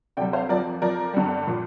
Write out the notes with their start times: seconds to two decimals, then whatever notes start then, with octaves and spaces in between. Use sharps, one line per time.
0.17 D2 C3 G3 D5 G5
0.33 C5 F5
0.49 F2 F3 A#4 D5
0.82 F2 F3 A#4 D5
1.14 G1 G2 G3
1.47 A#2 F3